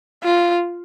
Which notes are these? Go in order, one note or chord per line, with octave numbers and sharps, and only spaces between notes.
F4